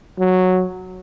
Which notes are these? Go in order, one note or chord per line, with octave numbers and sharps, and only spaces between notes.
F#3